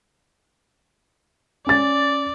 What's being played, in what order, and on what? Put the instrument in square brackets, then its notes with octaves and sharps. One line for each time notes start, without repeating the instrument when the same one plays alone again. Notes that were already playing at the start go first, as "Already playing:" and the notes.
[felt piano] C#4 A6 [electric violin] D5